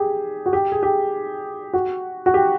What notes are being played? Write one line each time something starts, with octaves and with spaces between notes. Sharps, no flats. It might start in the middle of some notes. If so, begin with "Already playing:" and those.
Already playing: G4 G#4
F#4
G4
G#4
G4
F#4
F#4
G4